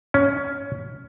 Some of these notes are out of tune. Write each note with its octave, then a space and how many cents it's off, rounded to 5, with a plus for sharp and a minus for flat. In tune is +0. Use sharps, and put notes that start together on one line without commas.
C#4 +15